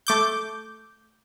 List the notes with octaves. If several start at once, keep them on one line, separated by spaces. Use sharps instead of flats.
A3 D6 G6